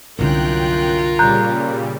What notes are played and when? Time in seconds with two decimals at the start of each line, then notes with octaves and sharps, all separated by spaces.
0.19 C2 F#2 D3 F4 A#4 G5 F#6
1.19 A#2 C#3 G3 A#5 F#6 G6